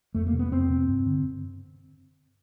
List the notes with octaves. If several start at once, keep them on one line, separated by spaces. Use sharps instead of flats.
F2 A3
A#3
C3
B3
F2 C4
C3
G2
D3